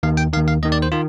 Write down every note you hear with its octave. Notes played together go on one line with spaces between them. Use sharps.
D#2 D#3 F5
G5
D#2 D#3 F5
F5
D#2 D#3 D#5
D5
C5
D#3 F4